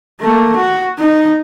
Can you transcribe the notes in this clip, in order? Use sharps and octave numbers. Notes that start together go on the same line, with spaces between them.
A3 A#3
F#4
D#4